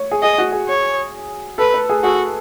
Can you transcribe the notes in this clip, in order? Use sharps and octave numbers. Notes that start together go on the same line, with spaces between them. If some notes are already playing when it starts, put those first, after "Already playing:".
Already playing: C#5
G#4
G#4 D#5
F#4
G#4
C#5
A4 B4
B4
G#4
F#4 G#4